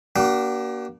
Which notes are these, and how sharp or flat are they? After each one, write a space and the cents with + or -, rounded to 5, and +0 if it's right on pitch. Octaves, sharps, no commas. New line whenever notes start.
A#3 +30 D4 -20 F#4 +45